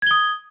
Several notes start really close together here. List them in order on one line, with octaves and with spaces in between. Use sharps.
G#6 G7 D#6